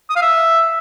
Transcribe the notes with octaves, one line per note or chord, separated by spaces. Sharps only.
D#6
F5
E5